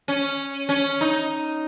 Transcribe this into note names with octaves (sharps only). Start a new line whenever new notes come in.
C#4
C#4
D#4